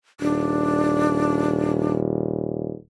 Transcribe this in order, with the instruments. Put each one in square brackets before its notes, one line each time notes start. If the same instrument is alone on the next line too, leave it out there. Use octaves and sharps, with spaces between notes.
[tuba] D#1 [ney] D4